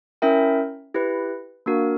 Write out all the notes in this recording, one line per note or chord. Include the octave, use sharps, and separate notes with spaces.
C#4 E4 A#4 E5 G5
E4 G4 B4
A#3 D4 F#4 A#4